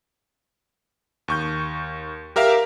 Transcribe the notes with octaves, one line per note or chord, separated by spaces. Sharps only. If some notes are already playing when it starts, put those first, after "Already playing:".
D#2 C#6 G6
G4 A#4 E5 F5